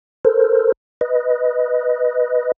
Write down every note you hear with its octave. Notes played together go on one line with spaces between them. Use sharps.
A4 A#4 C5
B4 D#5